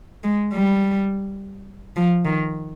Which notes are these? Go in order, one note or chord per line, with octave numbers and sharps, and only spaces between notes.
G#3
G3
F3
D#3